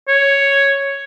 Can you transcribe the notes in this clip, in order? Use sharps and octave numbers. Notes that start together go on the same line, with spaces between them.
C#5